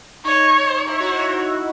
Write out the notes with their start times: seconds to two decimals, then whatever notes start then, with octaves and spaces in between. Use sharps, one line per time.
0.25 D#4 C#5
0.88 E4 C#5
1.00 F#4
1.13 E4